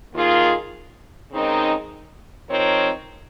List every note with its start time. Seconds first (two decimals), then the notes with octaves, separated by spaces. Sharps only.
0.13 D#2 D#3 A#3 F4 G#4
1.31 C#3 G#3 C4 D#4 A#4
2.49 F3 C4 D#4 A#4 C#5